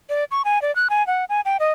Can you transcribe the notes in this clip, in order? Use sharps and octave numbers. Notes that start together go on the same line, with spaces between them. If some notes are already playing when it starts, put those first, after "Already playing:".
D5
C#6
G#5
D5
F#6
G#5
F#5
G#5
G5
D#5